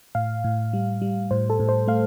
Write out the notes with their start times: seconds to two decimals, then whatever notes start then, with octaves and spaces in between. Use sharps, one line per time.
0.15 A2 F5
0.44 A2
0.73 G3
1.02 G3
1.31 A2 C5
1.50 A4
1.60 A2
1.69 C5
1.88 A3 F5